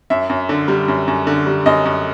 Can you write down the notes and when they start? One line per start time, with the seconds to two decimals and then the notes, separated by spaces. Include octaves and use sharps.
0.10 F#2 E5
0.30 F#2
0.49 D3
0.68 G3
0.88 F#2
1.08 F#2
1.27 D3
1.46 G3
1.66 F#2 D#5
1.85 F#2